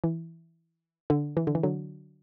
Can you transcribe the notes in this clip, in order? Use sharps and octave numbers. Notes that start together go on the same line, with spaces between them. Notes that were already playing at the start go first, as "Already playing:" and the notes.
E3
D3
E3
D3
E3
D3 F#3